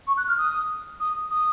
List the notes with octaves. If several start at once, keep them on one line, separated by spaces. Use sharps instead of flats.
C#6
F#6
F6
D#6
D#6
D#6